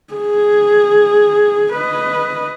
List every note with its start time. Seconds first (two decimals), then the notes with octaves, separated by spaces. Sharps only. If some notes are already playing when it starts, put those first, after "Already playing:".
0.14 G#4
1.73 B4 D#5